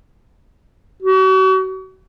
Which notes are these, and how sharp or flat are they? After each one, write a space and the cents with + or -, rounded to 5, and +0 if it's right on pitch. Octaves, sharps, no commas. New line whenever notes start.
F#4 +40